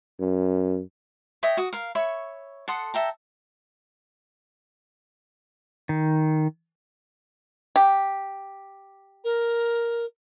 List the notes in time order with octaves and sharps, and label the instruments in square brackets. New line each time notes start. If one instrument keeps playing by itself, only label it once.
[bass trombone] F#2
[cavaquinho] C#5 D#5 E5 G5
F#4 D#6
A#4 F5
C#5 E5 B5 C#6
A4 F#5 C6 D#6
A4 E5 G5 A#5
[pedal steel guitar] D#3
[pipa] G4
[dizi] A#4